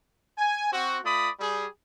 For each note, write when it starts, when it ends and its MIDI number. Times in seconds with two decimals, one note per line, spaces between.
0.38 0.70 80
0.72 0.99 60
0.72 0.99 66
1.04 1.29 57
1.04 1.29 65
1.04 1.29 74
1.04 1.29 83
1.04 1.29 87
1.40 1.67 55
1.40 1.67 68